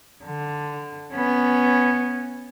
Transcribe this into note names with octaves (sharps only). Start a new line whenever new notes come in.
D3
B3 C#4